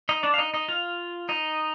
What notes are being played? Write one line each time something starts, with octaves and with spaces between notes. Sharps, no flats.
D#4 D#5
D4 D5
F5
D#4 D#5
D#4 D#5
F4 F5
D#4 D#5